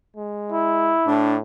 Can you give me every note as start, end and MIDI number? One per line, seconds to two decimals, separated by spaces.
0.16 0.96 56
0.52 1.20 64
1.07 1.41 45
1.07 1.36 62